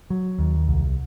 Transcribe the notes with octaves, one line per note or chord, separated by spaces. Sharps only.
F#3
D#2
C2